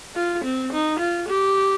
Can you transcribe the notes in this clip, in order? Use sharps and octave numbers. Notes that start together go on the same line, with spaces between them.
F4
C4
D#4
F4
G4